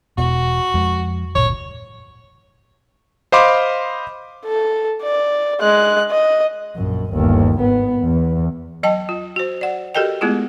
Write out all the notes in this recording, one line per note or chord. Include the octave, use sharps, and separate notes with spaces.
E1 B2 F#4
F2 G#3
D1 G1 A#2 C#5
C5 D#5 F5 B5 C6 D6
A4
D5
G#3 F#6
D#5
A#1 F#2
G1 D#2
G#1 B3
E2
F#3 D#5 G5 A5
F4
F#4 C5
D5 F#5
F#4 G4 A4 A#4 D#5 G5
G#3 A3 B3 E4 F4 G#4